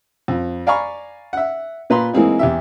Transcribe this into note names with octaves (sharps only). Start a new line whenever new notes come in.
F2
D5 F5 G#5 A#5 B5 C#6
E5 F#5
A#2 B4 A#5 C6
E3 G#3 A#3 C4 D#4
E2 G4 E5